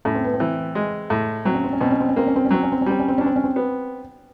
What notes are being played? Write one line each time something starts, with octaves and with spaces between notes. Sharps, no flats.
A2 C#4
C4
B3
C4
E3
G#3
A2
F#3 C4
C#4
C4
C#4
B2 C4
C#4
C4
C#4
A#3 C4
C#4
C4
C#4
F#3 C4
C#4
C4
C#4
G3 C4
C#4
C4
C#4 D4
C4
C#4
C4
B3